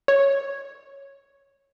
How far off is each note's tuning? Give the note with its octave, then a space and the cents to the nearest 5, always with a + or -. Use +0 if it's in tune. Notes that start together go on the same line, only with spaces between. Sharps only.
C#5 -5